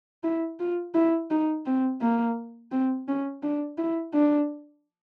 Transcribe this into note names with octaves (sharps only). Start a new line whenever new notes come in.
E4
F4
E4
D#4
C4
A#3
C4
C#4
D4
E4
D4